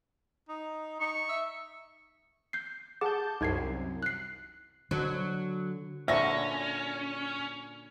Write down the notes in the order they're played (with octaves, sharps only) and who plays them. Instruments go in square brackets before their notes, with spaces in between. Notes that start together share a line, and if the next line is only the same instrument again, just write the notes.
[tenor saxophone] D#4
[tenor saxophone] D#4 [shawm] C#6
[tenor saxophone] E5
[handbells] G6 C7
[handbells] G#4 F#5 D6 [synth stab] A5 G6
[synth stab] C2 F#2 [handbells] D#4 G#6 C7
[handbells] F#6 C7
[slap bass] D3 [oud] F#3
[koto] A#2 D3 F#4 [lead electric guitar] C#4 [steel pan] E5 C#6 [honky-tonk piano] A#6